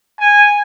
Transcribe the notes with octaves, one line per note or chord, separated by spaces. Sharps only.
G#5